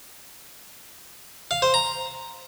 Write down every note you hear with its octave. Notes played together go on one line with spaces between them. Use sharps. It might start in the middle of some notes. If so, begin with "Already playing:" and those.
F5
C5
A#5